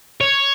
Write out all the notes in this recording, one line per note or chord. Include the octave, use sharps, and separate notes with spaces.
C#5